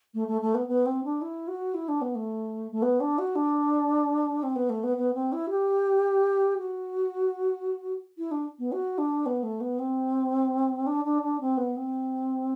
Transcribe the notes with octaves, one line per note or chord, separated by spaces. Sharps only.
A3
A3
A3
B3
B3
C4
D4
E4
F#4
E4
D4
B3
A3
A3
B3
D4
F#4
D4
C4
B3
A3
B3
B3
C4
E4
G4
F#4
E4
D4
B3
F#4
D4
B3
A3
B3
C4
D4
D4
D4
C4
B3
C4